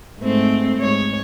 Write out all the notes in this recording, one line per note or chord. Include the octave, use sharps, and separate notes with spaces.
G#2 A3 C4
G#2 C#5